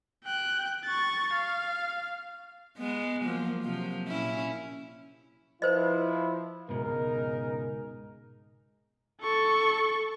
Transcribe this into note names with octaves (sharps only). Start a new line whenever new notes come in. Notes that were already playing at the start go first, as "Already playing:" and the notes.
G5 F#6
C#6 A6
F5
G#3 B3
F3 F#3 A#3
C3 F3 F#3
A#2 C#4 E4
F3 E4 B4 C5 D#5
C#2 G#2 B2 D#4 G#4 A#4
A4 C#6